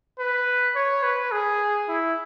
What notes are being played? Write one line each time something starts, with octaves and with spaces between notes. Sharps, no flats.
B4
C#5
B4
G#4
E4